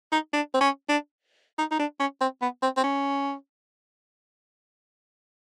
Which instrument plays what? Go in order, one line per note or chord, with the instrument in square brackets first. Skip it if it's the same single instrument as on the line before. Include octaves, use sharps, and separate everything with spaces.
[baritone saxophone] D#4
D4
C4
C#4
D4
D#4
D#4
D4
C#4
C4
B3
C4
C4
C#4